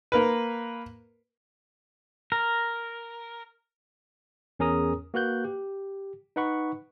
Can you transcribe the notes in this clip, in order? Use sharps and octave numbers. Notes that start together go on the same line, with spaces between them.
A#3 A#4 B4
A#4
E2 C#4 G#4 A#4 A#5 D#6
A#3 F#4 B4 F#6 G6
G4
D#4 B4 F#5 B5 C#6